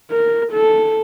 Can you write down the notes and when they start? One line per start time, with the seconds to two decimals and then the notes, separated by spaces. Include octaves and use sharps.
0.11 A#4
0.52 A4